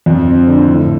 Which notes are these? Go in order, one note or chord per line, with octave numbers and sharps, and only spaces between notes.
F2
C4
D3
A2